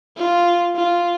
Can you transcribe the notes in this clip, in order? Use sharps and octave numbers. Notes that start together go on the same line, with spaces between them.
F4
F4